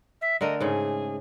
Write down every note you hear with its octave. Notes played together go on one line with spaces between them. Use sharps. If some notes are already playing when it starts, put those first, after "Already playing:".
E5
D3 A3 A#4 D#5
G#2 C#3 A3 G#4